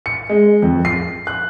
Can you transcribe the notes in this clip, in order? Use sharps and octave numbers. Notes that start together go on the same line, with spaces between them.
C#7
G#3
F2
C7
F#6